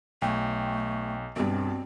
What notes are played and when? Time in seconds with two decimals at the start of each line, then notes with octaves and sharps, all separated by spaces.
0.22 B1 A3 G5 G#5
1.36 B1 G2 C4